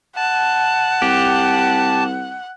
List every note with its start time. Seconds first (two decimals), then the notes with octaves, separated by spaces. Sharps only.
0.16 F#5 A5
1.02 C2 G4